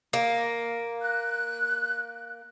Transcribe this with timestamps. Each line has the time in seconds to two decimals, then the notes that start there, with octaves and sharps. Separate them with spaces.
0.13 A#3
1.01 F#6